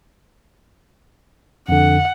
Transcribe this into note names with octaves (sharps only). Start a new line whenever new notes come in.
F2 D3 F#5